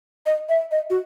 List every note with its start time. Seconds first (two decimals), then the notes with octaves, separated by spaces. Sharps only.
0.26 D#5
0.49 E5
0.72 D#5
0.90 F#4